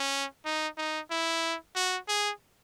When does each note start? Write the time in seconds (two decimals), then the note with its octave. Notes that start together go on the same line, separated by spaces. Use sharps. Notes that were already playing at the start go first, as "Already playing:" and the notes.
Already playing: C#4
0.45 D#4
0.77 D#4
1.11 E4
1.76 F#4
2.08 G#4